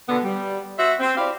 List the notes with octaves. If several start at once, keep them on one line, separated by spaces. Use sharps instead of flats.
B2 D3 B3
G3
F#4 C5 E5
C4
E4 G4 C5 D5 F5